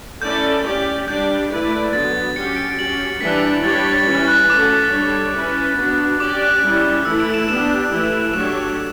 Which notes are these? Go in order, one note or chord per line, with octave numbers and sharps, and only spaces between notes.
A3 C#4 E4 A4 D5 G6
C#4 G4 D5
G3 D4 G4 D5 G6
A3 E4 B4 D5
D3 F#3 B3 A6
F#3 C#4 G4 C#7
D7
F#3 C#4 G4 F#7
E3 G3 D4 G4 B6
G3 D4 G4 C#5 A6
A6
E3 G3 C#4
F#6
A3 C#4 F#4 A4 D6
G3 D4 A4 C#5
C#4 E4 B4
B3 D4 F#4
C#4 G4 D5 D6
F#6
G3 C#4 E4
E3 A3 E4 A4 E6
D7
E7
B3 D4 G4 E7
E3 A3 E4
F#3 A3 D4 G4 C#5 E7